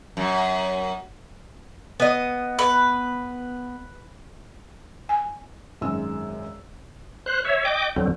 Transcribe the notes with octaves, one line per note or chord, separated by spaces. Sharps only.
F#2
B3 D#5
B4
G#5
G#1 F#2 G#3 E6
C5 F#6
C#5 E5
D#5 G5 D6
F2 D3 F#3 C4